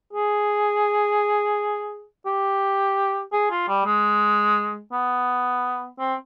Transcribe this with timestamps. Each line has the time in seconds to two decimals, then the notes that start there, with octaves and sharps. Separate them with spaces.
0.13 G#4
2.26 G4
3.33 G#4
3.50 F4
3.68 G3
3.86 G#3
4.93 B3
5.99 C4